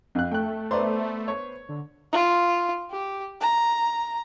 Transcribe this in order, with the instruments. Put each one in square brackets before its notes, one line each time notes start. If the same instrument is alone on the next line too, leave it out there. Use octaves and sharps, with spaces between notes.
[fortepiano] F2 F#6
[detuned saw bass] A3 [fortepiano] G5 F#6
[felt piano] B3 B4 C5 [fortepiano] D5 A#5 C6
[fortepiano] C#5
[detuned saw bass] D3
[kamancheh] F4
G4
A#5